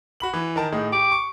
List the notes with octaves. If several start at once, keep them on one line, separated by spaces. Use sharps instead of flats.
F#4 B5 F#7
E3
D#3 A#4 A5
A2 D#4 G#4
G4 D6
C#6